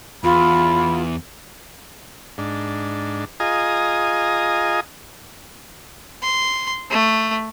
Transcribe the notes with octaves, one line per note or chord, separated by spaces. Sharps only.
E2 F4 B5
G#2 D4
F4 G#4 D#5 G#5 A#5 D#6
C6
A3